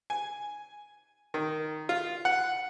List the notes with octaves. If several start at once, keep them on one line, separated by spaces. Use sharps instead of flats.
G#5
D#3
F4
F#5